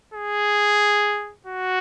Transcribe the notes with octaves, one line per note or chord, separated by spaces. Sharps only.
G#4
F#4